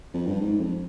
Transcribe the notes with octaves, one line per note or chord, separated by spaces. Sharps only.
F2
G2
G#2
F2